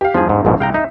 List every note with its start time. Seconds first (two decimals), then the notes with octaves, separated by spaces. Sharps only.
0.01 G4 F5
0.14 E2 G2 F3 G#4
0.29 G#2
0.45 A#1 G#2 B2
0.60 C2 F5 G5 A#5
0.74 D#4 E5